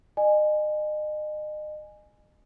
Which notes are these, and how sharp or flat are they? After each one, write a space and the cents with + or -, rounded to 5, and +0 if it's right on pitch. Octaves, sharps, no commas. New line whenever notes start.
D#5 -35 G#5 +0